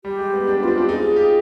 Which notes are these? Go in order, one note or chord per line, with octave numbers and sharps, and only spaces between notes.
G3 G4
G#3
B3
D4
B3
C4 D4 F4
D4 G4
D#4 G#4
F4
G4